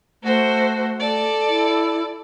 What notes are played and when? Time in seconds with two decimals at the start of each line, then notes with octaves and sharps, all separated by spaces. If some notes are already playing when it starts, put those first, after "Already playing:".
0.23 A3 F#4 C5
1.00 A4 D5
1.49 E4